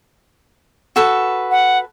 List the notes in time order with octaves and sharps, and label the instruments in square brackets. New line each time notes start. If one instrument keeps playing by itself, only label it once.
[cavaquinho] F#4 A4 B4
[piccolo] F#5